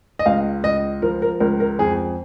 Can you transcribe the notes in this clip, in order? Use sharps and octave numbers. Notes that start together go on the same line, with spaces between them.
D#5
C#2 F5
C#2 D#5
F3 A#4
A#4
C#2 A#4
A#4
F2 G#4